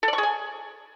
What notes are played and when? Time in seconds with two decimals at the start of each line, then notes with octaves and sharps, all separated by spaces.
0.03 A4
0.08 D5
0.13 C#6
0.18 G#4
0.23 G#5